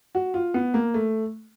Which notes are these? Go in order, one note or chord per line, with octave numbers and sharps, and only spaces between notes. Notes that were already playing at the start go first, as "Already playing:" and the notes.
F#4
F4
B3
A#3
A3